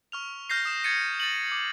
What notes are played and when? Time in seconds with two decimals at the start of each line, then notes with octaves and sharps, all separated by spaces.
0.12 C#6 F6 F7
0.50 F6 G6 A#6 C7
0.65 D#6 E7
0.84 G#6 A6 C#7 D#7
1.20 A6 D#7 F#7
1.52 D6